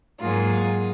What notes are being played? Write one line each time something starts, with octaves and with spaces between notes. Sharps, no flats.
G#2 F#3 A#3 F4 G#4